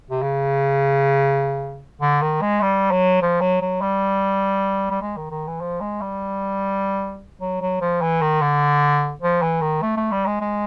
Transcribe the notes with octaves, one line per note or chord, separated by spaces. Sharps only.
C3
C#3
D3
D#3
G#3
G3
F#3
F3
F#3
F#3
G3
G3
G#3
D#3
D#3
E3
F3
G#3
G3
F#3
F#3
F3
E3
D#3
D3
F3
E3
D#3
A3
A3
G3
G#3
G#3